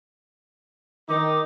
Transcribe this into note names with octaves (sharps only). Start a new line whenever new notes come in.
D#3 D#4 D6